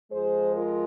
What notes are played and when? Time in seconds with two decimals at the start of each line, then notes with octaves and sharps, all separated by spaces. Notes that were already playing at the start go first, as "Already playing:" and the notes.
0.11 F2 F3 G#3 G#4 C5
0.56 F4 A#4